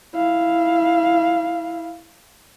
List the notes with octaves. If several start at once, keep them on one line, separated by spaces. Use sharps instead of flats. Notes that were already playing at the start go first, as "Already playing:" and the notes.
E4 F5